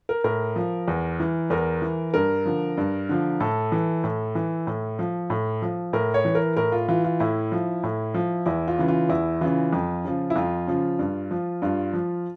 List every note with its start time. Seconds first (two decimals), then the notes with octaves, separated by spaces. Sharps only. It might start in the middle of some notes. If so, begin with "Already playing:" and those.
0.09 A#4
0.24 A2 A#4
0.56 F3
0.88 E2
1.20 E3
1.50 E2 A#4
1.82 E3
2.14 G2 A#4
2.46 D3 F3
2.77 G2
3.09 D3 F3
3.40 A2 A4
3.72 E3
4.04 A2
4.35 E3
4.67 A2
4.99 F3
5.30 A2
5.62 F3
5.93 A2 A#4
6.14 C#5
6.25 E3
6.35 A#4
6.57 A2 A#4
6.72 F4
6.88 E3 F4
7.04 F4
7.20 A2 E4
7.52 F3
7.83 A2
8.14 F3
8.46 E2 E4
8.68 F4
8.78 C#3 E3
8.88 F4
9.09 E2 E4
9.41 C#3 E3 F4
9.73 F2
10.05 C#3 F3
10.30 E4
10.36 F2 F4
10.67 C#3 F3
10.99 G2
11.31 F3
11.62 G2 F4
11.93 F3